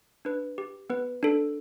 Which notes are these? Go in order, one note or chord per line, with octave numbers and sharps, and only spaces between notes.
D4 B4
G4
B3 B4
D4 A4